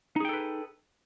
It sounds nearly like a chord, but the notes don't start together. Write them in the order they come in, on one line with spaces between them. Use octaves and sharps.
D#4 G#4 G5 A4 B4